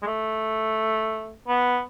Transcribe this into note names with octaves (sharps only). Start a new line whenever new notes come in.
G#3
A3
B3